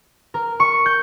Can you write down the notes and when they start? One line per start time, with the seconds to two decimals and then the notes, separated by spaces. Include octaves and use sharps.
0.34 A#4
0.60 C#6
0.86 G6